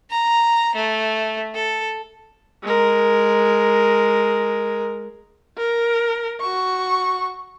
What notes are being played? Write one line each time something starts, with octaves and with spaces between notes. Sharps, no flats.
A#5
A3
A4
G#3 A#4
A#4
F#4 C#6